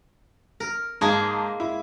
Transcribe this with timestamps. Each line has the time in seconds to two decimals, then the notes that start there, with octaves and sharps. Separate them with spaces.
0.60 A#4
1.01 G#2 G#3 A#3 D#4 G#4 A5
1.60 E4